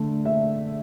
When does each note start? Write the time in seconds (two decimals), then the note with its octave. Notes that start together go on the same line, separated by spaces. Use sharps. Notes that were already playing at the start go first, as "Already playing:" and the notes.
Already playing: D3 A3
0.25 E5